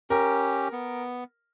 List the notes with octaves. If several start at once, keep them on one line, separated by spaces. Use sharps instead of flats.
C#4 G4 A#4
B3